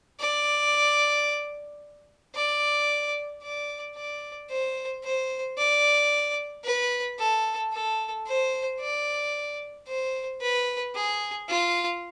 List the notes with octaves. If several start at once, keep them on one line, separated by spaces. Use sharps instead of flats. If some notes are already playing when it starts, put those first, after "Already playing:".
D5
D5
D5
D5
C5
C5
D5
B4
A4
A4
C5
D5
C5
B4
G#4
F4